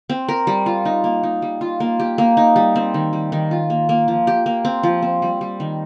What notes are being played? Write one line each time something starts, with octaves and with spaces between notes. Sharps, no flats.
C4
A#4
G3
F4
D#4
A#3
D#4
G3
F4
A#3
G4
A#3
D#4
G3
C4
D#3
G3
D#3
F4
A#3
A#3
F3
G4
A#3
C4
F3
C4
G3
G3
D#3